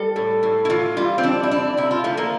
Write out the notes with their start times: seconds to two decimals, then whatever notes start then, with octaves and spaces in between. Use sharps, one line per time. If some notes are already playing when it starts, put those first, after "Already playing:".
Already playing: G3 A4
0.16 A2
0.43 A2
0.65 E4
0.70 E3 F4
0.97 G3 F4
1.18 C4
1.24 F2 D4
1.43 E4
1.51 F2 D4
1.77 C3 E4
1.91 F4
2.04 F3 A3
2.17 A#3